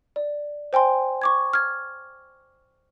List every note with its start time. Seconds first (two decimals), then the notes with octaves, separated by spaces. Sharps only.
0.16 D5
0.73 C5 G5 G#5 C6
1.22 C#6 D6 G#6
1.53 F6 G#6